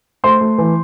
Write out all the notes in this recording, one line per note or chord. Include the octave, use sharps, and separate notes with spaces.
A3 C5 C6
A3
E3